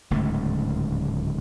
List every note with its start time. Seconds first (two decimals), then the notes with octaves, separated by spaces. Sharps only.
0.10 D1 C#2 G#2 A3